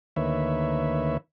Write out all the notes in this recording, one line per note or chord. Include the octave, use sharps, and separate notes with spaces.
D2 D#3 A#3 B4 C#5 E5